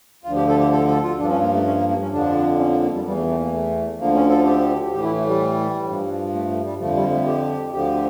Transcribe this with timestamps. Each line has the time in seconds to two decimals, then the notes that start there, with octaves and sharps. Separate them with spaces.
0.24 D2 D3 F3 F4
0.36 G4
0.48 A4
0.59 G4
0.72 A4
0.87 A4
1.02 F4
1.18 G2 F3 D4
1.29 C#4
1.41 A#3
1.53 A3
1.64 C#4
1.77 A#3
1.88 A#3
1.99 C#4
2.11 F2 D3 F3 D4
2.59 C#4
2.70 A#3
2.81 A#3
2.94 G3
3.04 E2 E3 G3
3.16 A3
3.28 A3
3.40 A#3
3.52 A3
3.98 D2 D3 F3 A#3
4.14 C#4
4.30 A4
4.45 G4
4.92 A2 E3 G4
5.03 E4
5.16 A3
5.27 G3
5.85 G2 F3
6.33 A3
6.48 A3
6.63 G3
6.78 F2 D3 F3 A3
6.94 G3
7.11 A3
7.26 G4
7.72 D2 D3 F3 G4